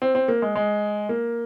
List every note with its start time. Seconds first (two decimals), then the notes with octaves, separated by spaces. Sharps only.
0.02 C4
0.15 C4
0.28 A#3
0.42 G#3
0.56 G#3
1.09 A#3